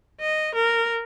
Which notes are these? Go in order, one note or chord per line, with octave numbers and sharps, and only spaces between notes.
D#5
A#4